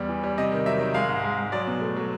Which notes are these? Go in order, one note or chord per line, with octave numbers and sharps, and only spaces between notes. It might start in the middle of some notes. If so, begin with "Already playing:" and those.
Already playing: E2 G3
E3
G3
C3 D#5
D#3
F#3 E5
D#3
G#3 F5
G#2
G#3
G#3
F#3 D5
B2
A3
F#3